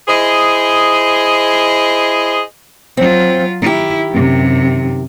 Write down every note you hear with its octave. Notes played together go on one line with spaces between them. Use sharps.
E4 G#4 C5 D#5
F#3 C4 F4
D#3 E4 G4
F#2 C3